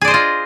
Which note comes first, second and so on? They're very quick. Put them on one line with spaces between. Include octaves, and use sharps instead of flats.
G#4 D5 C5 D#5 F4